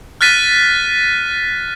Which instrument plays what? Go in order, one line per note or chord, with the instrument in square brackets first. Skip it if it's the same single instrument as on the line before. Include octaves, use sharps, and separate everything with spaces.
[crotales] F6 F#6 A6 B6 D#7